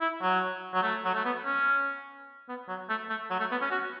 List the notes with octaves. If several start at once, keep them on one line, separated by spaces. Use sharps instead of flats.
E4
F#3
F#3
A3
F#3
A3
B3
C#4
B3
F#3
A3
A3
F#3
A3
B3
C#4
F#4